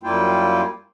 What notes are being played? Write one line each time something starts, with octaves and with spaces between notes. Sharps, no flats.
F#2 G3 A#3 E4 F4 G5